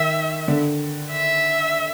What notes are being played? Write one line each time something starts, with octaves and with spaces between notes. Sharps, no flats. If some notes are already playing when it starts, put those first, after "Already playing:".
Already playing: D#3 E5
D3
E5